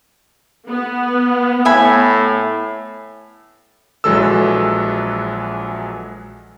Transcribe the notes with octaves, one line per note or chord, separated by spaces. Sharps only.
B3
A2 E5 G#5 B5
A#1 E3 F#3 G#3 A4 E6